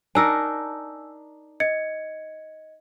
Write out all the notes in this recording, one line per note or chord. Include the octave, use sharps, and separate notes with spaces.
D4 D#4 A#4 G#5 E6
D#5 G#6 C#7